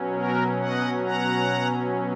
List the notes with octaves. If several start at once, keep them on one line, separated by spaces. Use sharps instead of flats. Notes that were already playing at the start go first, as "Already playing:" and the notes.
Already playing: B2 F#3 C#4
F#4 A#4
D#5 F#5
F#5 A#5